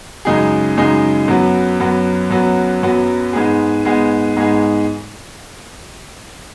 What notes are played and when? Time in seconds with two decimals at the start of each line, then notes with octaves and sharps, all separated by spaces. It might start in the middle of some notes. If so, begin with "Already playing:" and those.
0.25 F#2 C#3 G#3 D#4 G#4
0.77 F#2 C#3 G#3 D#4 G#4
1.28 F#2 F#3 B3
1.80 F#2 F#3 B3
2.30 F#2 F#3 B3
2.83 F#2 F#3 B3
3.33 G#2 G#3 B3 G#4
3.85 G#2 G#3 B3 G#4
4.36 G#2 G#3 B3 G#4